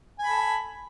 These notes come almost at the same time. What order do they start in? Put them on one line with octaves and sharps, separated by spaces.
G#5 B5 A4